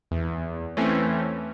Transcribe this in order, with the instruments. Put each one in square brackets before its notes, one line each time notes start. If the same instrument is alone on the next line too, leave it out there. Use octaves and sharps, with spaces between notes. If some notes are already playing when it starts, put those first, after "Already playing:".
[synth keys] E2
E3 A3 C4 C#4